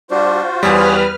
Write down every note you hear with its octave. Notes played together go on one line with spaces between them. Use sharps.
G3 D4 F4 F#4 C5
E2 G3 G#4 B4 C#5 F6